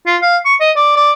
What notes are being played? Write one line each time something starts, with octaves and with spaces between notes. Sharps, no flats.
F4
F5
C#6
D#5
D5
D5